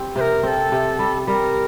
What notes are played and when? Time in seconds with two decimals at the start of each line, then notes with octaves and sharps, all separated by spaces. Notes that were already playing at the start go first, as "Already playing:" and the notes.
Already playing: G3 C4
0.16 C3 C5
0.21 A#4
0.43 C4 A4 A#4
0.72 C3
0.99 G3
1.27 G3 A#4